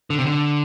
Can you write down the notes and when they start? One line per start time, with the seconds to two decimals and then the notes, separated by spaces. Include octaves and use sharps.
0.10 D3
0.18 C3
0.26 D3